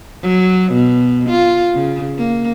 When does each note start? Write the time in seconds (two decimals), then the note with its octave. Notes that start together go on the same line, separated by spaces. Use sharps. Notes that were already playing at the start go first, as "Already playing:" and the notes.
0.23 F#3
0.72 B2
1.30 F4
1.75 C#3
2.18 A#3